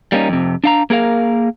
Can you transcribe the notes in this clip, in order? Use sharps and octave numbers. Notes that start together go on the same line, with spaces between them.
G3 A#3 C#4 D#4
F2 C3
D4 F5 A#5
A#3 G#4 A#4 F5